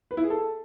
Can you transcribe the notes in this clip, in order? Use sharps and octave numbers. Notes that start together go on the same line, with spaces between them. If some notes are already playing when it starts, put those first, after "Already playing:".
B4
E4
G#4
A4